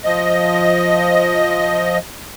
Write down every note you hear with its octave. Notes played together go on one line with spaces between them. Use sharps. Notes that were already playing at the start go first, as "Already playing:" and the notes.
F3 D#5